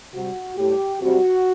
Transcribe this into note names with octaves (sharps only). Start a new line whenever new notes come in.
C3 G3 F#4
A2 G3 G4
C3 G3 F#4